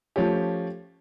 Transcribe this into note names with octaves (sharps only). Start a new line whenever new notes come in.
F3 A3 C#4 G4